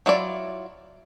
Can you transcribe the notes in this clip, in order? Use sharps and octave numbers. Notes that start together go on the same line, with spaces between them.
F#3 E4 F4 D5